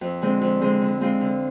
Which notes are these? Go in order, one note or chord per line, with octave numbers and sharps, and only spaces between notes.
F2
D3 G#3 C4
F2
D3 G#3 C4
D3
G#3 C4 F4
D3